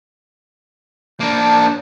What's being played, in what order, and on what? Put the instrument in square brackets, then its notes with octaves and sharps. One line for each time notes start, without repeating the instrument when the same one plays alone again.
[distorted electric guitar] A#3 D4 [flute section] A5 G6